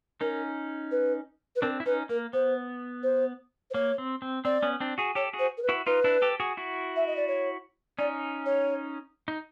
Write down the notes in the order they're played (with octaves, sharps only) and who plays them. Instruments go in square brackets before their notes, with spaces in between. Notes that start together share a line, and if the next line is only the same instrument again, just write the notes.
[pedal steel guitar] C#4 D#4 [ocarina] A#4
[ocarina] B4
B4
[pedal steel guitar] C4 D4 [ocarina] A#4
[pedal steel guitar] E4
[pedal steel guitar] C#4 D#4 [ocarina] B4
[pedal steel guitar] A#3 [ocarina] A#4
[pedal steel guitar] B3 [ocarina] C5
[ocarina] C5
C5
[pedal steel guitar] A#3 [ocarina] C#5
[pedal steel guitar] C4
C4
[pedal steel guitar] C4 [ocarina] D5
[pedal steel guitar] B3 C#4
C4 D4
F#4 G#4
[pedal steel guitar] G4 A4 [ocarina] C#5
[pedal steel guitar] F#4 G#4
[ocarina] C5
A#4
B4
[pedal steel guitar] E4 F#4
[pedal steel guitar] D#4 F4 [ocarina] B4
[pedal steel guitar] D4 E4
G4 A4
F#4 G#4
E4 F#4
[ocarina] E5
D#5
D5
C#5
[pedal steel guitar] C#4 D#4 [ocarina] D5
[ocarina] C#5
[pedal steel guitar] D#4